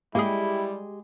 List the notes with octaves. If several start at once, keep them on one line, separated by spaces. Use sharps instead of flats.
G3 G#3 A#3 E4 G4 G#4